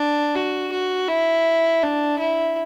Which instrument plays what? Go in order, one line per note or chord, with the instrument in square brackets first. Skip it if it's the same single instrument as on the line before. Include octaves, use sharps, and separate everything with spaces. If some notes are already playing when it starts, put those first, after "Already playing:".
Already playing: [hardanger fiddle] D4
F#4
F#4
E4
D4
E4